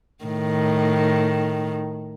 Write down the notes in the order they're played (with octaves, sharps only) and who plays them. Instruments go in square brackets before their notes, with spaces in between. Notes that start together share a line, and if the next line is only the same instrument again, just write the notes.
[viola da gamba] A2 D#3